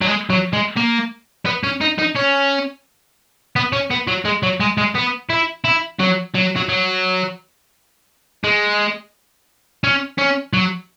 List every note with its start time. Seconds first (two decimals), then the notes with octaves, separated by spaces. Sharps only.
0.01 F#3
0.07 G#3
0.30 F#3
0.53 G#3
0.77 A#3
1.46 B3
1.63 C#4
1.81 D#4
1.98 D#4
2.15 C#4
3.56 B3
3.72 C#4
3.90 B3
4.07 F#3
4.25 G#3
4.43 F#3
4.60 G#3
4.78 G#3
4.95 B3
5.30 E4
5.64 E4
6.00 F#3
6.35 F#3
6.56 F#3
6.69 F#3
8.44 G#3
9.84 C#4
10.18 C#4
10.53 F#3